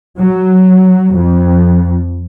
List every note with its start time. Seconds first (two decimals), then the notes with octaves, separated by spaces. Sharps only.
0.18 F#3
1.14 F2